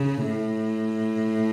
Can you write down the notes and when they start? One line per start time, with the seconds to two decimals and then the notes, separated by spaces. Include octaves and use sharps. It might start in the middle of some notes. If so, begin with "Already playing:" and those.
Already playing: C#3
0.23 A2